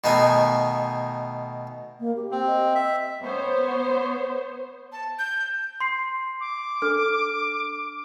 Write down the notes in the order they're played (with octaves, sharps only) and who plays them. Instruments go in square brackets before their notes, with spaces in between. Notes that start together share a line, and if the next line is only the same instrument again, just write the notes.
[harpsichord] B2 D#3 A3 D#4 G#5
[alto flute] A#3
G4
[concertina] C4
[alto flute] D#5
[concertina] E5
[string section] B3 C5 C#5
[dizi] A5
G6
[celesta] C6 C7
[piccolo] D6
[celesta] D4 A4 F6